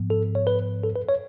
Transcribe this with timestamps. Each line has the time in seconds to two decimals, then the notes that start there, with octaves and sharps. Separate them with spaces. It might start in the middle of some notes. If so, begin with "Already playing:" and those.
Already playing: G#2 F3 B3
0.10 A4
0.35 C#5
0.47 B4
0.83 A4
0.95 B4
1.09 C#5